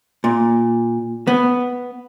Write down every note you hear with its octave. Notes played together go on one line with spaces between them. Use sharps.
A#2
B3